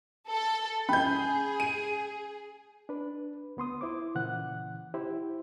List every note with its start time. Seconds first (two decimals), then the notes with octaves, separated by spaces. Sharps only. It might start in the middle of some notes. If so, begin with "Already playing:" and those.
0.30 A4
0.89 C#4 G#4 B5 G6
1.60 D#7
2.89 D4 B4
3.57 D2 B3 C6 D#6
3.81 E4 C5 D6
4.15 A#2 C#3 E3 F#5 F#6
4.94 E4 G4 C5